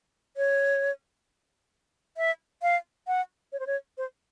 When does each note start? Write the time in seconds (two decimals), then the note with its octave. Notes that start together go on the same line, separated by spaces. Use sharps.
0.37 C#5
2.17 E5
2.62 F5
3.07 F#5
3.52 C#5
3.60 C5
3.67 C#5
3.98 C5